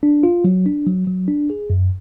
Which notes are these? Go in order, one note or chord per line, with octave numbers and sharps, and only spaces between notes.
D4
F4
F#3
D4
F#3
F#3
D4
G#4
F#2